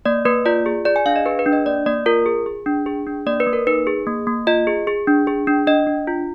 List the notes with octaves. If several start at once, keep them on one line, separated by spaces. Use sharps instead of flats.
A#3 D5
A#3 B4
F4 D5
G#4
G#4 D5
G#5
D4 F5
D#5
G#4 B4
B4
D4
D#5
A#3 D5
A#3 D5
F4 A#4
G#4
G#4
D4
G#4
D4
A#3 D5
B4
A#3
A#4
D#4 B4
G#4
A#3
A#3
F4 D#5
G#4
G#4
D4
G#4
D4
D4 D#5
D4
F4